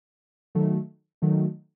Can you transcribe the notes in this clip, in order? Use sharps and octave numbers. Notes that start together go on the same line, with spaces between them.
D#3 F#3 A3
D#3 F#3 A3